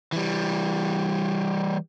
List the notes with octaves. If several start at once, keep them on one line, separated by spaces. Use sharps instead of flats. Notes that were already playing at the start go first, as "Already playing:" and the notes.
E3 G3